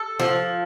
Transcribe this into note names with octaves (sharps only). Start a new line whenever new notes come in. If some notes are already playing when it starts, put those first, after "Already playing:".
Already playing: A4
F3